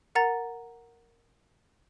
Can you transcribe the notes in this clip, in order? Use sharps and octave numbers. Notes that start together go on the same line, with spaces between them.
A#4 F#5 A#5 A6